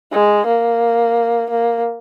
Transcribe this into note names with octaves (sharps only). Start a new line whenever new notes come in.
G#3
A#3
A#3